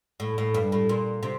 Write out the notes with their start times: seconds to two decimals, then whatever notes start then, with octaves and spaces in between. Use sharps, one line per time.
0.20 A2
0.38 A2
0.54 G2
0.72 A2
0.89 A#2
1.23 C3